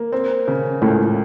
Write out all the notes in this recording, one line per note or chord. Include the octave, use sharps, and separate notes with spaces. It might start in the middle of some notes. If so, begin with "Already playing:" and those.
Already playing: A#3
C4
C#3
C#2 A2